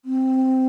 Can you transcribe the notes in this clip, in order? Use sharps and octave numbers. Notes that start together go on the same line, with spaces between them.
C4